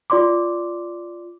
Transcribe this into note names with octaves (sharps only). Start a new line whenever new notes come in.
F4 D5 C6 D6